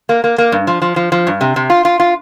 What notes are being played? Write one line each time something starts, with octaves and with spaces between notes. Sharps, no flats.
A#3
A#3
A#3
G2
F3
F3
F3
F3
G2
C3
C3
F4
F4
F4